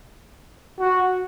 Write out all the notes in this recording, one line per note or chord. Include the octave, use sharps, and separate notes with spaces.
F#4